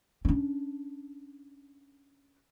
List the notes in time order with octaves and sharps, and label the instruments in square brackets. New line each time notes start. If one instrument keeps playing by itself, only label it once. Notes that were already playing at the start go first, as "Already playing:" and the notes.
[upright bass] C#4 D4